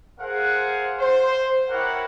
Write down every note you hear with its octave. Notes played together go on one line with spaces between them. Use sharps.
G#4 A#4 C5 F5 F#5
C5
E4 G4 A#4 C5 C#5 F#5